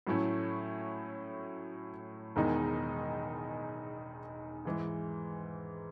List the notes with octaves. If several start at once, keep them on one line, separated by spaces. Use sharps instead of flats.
A2 F#3 A3 C#4 E4
E1 E2 D#3 G#3 D#4
G#2 E3 G#3